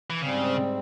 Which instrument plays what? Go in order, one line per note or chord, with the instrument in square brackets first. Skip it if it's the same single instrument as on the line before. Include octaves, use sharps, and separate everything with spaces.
[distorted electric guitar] E3
[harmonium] G#2 G3 C4 [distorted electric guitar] C#3